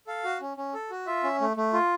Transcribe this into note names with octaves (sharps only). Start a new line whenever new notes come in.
A4 F5
F#4
C#4
C#4
A4
F#4
F4 E5
C#4
A3
A3
F4